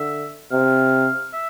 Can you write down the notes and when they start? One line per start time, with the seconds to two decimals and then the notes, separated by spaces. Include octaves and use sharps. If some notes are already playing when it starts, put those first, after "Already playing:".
Already playing: D3 E5
0.51 C3 F5
1.33 E5